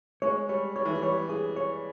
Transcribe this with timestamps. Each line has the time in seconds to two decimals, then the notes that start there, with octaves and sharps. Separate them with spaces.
0.22 G#3 C#5
0.49 G3 C#5
0.75 G3 C#5
0.85 E3
0.95 G3
1.03 C#5
1.30 G#4
1.56 C#5